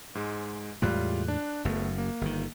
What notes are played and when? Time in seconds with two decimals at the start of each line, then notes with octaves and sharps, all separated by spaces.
0.15 G#2 G#3
0.82 E2 A2 G3 G#3 F4 F#6
1.28 D4
1.65 F#1 F#2 A3 B3
1.98 A#3
2.21 G1 D#3